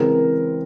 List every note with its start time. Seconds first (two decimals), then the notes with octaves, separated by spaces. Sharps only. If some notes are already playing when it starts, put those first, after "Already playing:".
Already playing: C#3 E3 G#3 C4 A#4